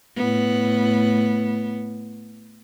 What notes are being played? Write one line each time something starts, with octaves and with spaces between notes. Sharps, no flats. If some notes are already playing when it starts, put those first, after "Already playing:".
A2 B3